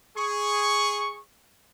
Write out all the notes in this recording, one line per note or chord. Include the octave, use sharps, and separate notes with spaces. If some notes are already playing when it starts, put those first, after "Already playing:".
G#4 C#6